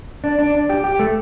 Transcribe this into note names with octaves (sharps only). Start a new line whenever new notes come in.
D4
D4
D4
G4
G4
A3